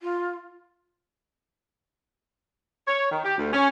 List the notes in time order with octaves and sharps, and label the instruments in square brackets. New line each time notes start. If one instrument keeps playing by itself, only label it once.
[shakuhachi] F4
[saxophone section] C#5
D#3
G4
D2
C#4